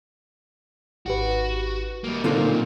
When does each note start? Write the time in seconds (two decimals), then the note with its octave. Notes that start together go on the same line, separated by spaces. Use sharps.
1.06 G#1 F#4 G4 B4
2.04 G3 A#3
2.24 B1 A#2 D3 A3 C4 D#4 F4 A#4